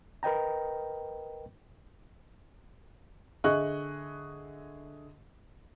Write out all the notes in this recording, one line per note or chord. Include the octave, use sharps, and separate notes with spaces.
A#4 B4 D#5 G5 A#5
D3 G#4 D#5 E5 C#6 F#6